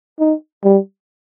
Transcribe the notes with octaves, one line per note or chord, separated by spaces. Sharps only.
D#4
G3